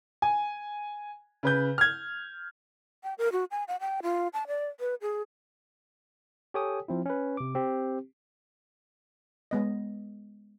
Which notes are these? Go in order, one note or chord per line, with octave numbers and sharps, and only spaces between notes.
G#5
C#3 B4 G6
F6 G#6
G5
A#4
F#4
G#5
F#5
G5
F4
A5
D5
B4
G#4
G4 A4 C#5 G5 G#5 D#6
F3 C4 E4
C#4 B4
C3 D6
C4 G4
G#3 B3 D#5